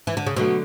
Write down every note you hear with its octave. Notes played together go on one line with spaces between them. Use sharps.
E3
D3
C#3
B2 D3 F#3 A3